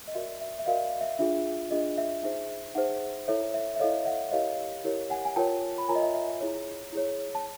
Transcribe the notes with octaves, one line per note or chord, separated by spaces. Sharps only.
D#5
F#4 A#4 D5 E5
E5
E5
F#4 A#4 D5 D#5 F5
E5
D4 F4 G#4 E5
D4 F4 G#4 D#5
E5
D#4 G#4 C5 E5
D#4 G#4 C5 E5 F#5
E4 A4 C#5 E5
E5
E5
E4 A4 C#5 D#5 F5
E5 F#5
E4 G4 A#4 C#5 D#5 F5
E4 G4 A#4 C#5
F#5 G#5
G#5
F4 A#4 C#5 G5 A5
B5
F4 A#4 C#5 G#5 A#5
D#5
E5
E5
E5
E4 G#4 C#5
E4 G#4 C#5
A5